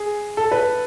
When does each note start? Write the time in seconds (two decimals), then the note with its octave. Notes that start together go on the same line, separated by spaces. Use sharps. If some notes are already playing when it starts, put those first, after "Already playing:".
Already playing: G#4
0.37 A4
0.52 B4